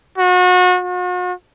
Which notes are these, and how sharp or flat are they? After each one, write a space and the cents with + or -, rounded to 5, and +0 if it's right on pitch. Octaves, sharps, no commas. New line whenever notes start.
F#4 -35
F#4 -45